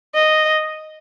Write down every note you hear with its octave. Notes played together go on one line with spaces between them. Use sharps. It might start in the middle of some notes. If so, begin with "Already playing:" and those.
D#5